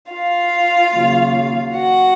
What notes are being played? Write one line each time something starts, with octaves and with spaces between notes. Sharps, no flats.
F4 F5
D#2 C#3 F#3
F#4 F#5